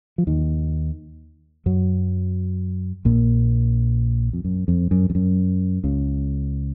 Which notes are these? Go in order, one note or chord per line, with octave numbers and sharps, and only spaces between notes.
F3
D#2 D#3
F#2 F#3
A#1 A#2
F2
F#2
F2
F#2
F2
F#2
C#2 C#3